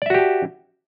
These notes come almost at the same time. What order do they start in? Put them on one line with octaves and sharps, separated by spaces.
D5 E5 F#4 G4 A5